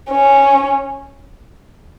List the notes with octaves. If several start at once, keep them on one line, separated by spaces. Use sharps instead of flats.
C#4